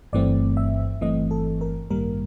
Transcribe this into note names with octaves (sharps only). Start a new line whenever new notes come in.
G1 G2 E3 A3 C4 D5
E5
G1 G2 E3 A3 C4 D#5
A4
A#4
A1 G2 D#3 G3 A#3 A#4